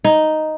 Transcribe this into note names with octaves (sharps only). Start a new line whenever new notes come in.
D#4